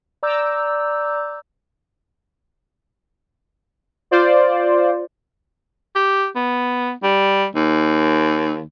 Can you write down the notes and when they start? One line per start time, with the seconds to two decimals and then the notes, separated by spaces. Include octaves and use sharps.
0.23 D5 A#5 D6 E6 G6
4.11 F4 C5 D5
5.95 G4
6.36 B3
7.03 G3
7.55 D#2